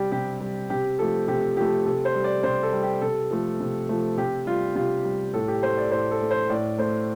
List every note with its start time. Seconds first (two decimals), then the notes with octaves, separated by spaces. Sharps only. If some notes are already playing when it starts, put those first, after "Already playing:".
Already playing: C3 G3 G4 D5
0.12 C3 G4
0.40 G3
0.70 C3 G4
0.99 F3 A3 A4
1.28 C3 G4
1.57 F3 A3 G4
1.86 C3 A4
2.05 C5
2.15 G3
2.24 D5
2.43 C3 C5
2.63 A4
2.73 G3
2.83 G4
3.02 C3 A4
3.31 F3 A3
3.60 C3
3.89 F3 A3
4.17 C3 G4
4.47 G3 F4
4.76 C3 F4
5.05 G3
5.34 A2 A4
5.48 G4
5.62 A3 C5
5.78 D5
5.91 A2 C5
6.11 A4
6.21 A3
6.31 C5
6.50 A2 D5
6.78 A3 C5